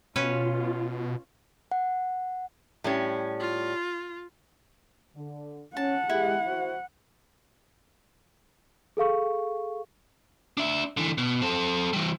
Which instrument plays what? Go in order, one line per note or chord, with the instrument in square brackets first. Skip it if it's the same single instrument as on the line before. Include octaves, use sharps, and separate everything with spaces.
[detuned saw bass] B2 [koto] C#4 B4 [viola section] F4
[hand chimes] F#5
[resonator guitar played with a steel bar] A2 G3 C#4
[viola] F4
[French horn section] D3
[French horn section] C#4 [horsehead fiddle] F#5 [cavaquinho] A5
[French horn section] G#3 G4 [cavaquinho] E4
[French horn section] F#4 C5
[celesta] G#4 A4 F5 C#6
[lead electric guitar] D4 E5
D3 E3
B2
C4 A4
E3 G3